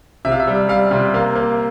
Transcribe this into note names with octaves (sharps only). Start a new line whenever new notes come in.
C3 E5
F5
E5
G3
G3 F5
C3
A#3 F5
A#3